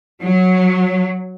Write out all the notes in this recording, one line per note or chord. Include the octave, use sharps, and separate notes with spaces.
F#3